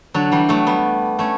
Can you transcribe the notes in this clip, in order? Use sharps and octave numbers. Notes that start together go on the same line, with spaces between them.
D3 F#3
E3 G3
F#3 A3
G3 B3
A3 C#4